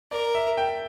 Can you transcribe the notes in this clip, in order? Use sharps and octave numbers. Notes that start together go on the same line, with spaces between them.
A#4 D5
E5
G5